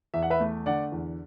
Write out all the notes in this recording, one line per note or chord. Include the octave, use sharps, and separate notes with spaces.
E2 E5
F#5
B4 E5
A3
D3 D5 F#5
E2